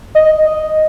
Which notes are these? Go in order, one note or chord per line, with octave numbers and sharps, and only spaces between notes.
D#5
D#5